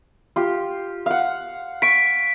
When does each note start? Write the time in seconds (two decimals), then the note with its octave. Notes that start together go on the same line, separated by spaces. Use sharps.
0.36 F4 G4
1.06 F5 F#5
1.82 C#6 B6 D7